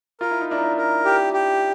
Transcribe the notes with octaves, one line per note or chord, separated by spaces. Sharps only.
F4 A#4
E4
D#4
D4 E4 A#4
D#4
D4 E4
A#4
G4
G4